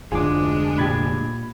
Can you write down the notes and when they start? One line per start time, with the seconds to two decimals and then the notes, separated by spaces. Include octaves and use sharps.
0.12 F1 D2 G#2 G#3 D4 F4 G#4 D6
0.78 A#2 G4 B5 G#6 A6